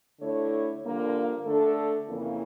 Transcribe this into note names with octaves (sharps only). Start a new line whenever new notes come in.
D3 A3 E4 A4 C#5
G2 D3 F3 A#3
D3 A3 D4 A4
F2 C#3 E3 A#3